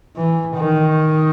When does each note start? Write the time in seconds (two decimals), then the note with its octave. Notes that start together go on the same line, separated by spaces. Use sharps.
0.17 E3
0.57 D#3